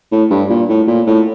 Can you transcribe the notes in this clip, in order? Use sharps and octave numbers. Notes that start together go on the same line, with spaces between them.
A2
G2
A#2
A2
A#2
A2